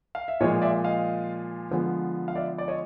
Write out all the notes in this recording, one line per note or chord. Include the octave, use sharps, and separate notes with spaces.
F5
E5
A#2 F3 G#3 C#5 D#5
D5 E5
D#5 F5
D3 F3 G#3 B3
F5
D5 E5
D5
C#5 D#5